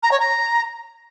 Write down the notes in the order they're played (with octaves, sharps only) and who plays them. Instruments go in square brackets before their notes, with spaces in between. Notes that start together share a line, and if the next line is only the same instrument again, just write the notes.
[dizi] A#5
C#5
A#5